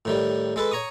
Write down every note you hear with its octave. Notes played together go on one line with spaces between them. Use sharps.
A2 D#3 G3
G#3 A4 B4
C#5 A#5 C#6 D#6